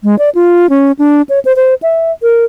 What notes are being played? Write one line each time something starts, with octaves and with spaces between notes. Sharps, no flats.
G#3
D5
F4
C#4
D4
C#5
C5
C5
E5
A#4